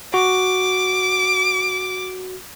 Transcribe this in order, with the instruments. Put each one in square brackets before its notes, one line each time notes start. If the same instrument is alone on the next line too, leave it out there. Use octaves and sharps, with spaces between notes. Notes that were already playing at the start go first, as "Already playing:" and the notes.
[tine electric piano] F#4 [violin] D6